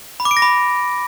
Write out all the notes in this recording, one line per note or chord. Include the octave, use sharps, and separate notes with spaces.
B5
D6
D7
A#6
B5